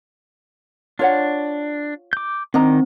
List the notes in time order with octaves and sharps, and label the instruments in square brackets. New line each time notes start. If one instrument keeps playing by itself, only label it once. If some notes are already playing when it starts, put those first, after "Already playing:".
[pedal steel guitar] D4 [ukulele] F4 C#5 F#5
[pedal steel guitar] D6 G6
[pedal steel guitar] D#3 [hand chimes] C4 [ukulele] D4 D#5 A#5